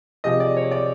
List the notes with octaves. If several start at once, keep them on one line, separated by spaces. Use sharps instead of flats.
C3 F3 G#3 D#5
D5
C#5
D5